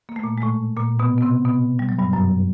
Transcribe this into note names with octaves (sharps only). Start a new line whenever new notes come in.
A#3
A3
A#2 A#3
G#3
A2 A3
A#2 A#3
B2 B3
B3
C3 C4
B2 B3
G3
F#3
G2 G3
F#2 F#3